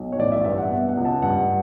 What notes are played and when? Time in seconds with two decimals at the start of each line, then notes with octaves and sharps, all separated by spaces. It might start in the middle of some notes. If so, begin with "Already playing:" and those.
Already playing: B1
0.12 C#5
0.19 A1 D5
0.32 E5
0.44 G2 E5
0.58 F#5
0.71 B2
0.89 F#5
0.97 C#2
1.05 A5
1.22 G2 F#5